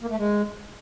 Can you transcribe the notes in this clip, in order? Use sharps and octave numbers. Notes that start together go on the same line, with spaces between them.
A#3
A3
G#3